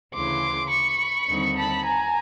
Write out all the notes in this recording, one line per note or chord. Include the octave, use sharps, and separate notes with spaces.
D2 C#3 E3 C6 D6
B5 C#6
D#2 D3 G3 C4 D#4
A5 B5
G#5 A#5